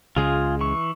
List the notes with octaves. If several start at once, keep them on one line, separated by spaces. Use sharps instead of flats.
C#2 C#3 G#3 F4 G#4
E3 C#6